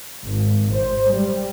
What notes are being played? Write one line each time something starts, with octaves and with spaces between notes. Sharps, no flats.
G#1
C5
G3